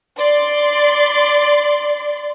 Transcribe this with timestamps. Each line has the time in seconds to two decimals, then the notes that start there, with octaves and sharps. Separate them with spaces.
0.18 D5 C6